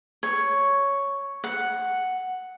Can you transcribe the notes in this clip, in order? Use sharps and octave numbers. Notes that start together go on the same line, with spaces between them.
C#5
F#5